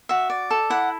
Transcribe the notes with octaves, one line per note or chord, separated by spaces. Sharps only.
F#4 E5
D5
A4
E4 F#5